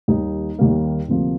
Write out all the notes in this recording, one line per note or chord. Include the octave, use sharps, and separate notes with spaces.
D#2 D#3 G3 A#3 D#4
D#2 D#3 G3 A#3
D2 C3 F3 A#3